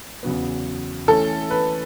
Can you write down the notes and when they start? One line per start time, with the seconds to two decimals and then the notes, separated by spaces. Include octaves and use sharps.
0.23 E2 C#3 F#3 B3
1.08 E3 A3 C#4 A4
1.51 B4